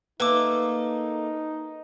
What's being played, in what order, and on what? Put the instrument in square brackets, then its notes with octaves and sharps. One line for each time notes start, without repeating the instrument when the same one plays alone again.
[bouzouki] A3 A#3 A4 [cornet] D#4 [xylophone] B4 D6